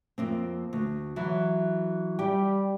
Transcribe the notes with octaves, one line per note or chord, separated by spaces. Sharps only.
F2 A#3 C4
D2
E3 F#3
G3 G4 G5